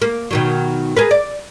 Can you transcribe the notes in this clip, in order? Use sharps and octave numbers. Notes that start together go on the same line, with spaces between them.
A#3
B2 D#3 F#3
G#4 A#4 B4
D5